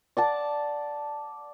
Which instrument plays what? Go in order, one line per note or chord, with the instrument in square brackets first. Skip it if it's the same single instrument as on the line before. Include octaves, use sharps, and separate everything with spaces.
[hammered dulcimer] D5 F#5 A5